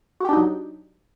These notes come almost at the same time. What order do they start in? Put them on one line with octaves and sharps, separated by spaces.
F#4 G4 D4 D#4 F#3